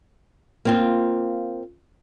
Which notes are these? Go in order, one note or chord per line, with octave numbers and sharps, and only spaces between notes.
A#3 C4 F4